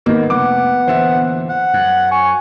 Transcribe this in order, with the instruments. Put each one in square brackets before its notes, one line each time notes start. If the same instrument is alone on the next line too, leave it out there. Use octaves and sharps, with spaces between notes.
[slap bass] G#1 G2 [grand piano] A#3 D#4 [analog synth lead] B3
[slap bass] F1 [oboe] F#5 [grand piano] D6
[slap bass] E2 A#2 D3 [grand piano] C5 E5
[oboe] F#5
[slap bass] F#2 [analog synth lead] F#6
[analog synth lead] G#5 [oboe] C#6